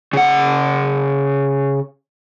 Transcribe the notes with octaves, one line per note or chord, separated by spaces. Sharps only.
C#3 F#5